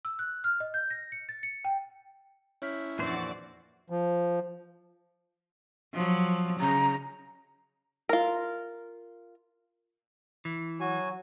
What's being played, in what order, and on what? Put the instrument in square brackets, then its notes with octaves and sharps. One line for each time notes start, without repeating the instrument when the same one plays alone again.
[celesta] E6
F#6
F6
D#5
G6
A#6
C#7
A6
C#7
G5
[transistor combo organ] C#4 E4 [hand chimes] C#5 F6 B6
[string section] F2 F#4 D5 [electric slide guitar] A#2 E3 C5 [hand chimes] D4
[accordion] F3
[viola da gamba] F3 F#3
[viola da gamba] C#3 [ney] A#5
[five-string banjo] F4 A#4
[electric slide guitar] E3
[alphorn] F#3 [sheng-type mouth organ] F#4 G#5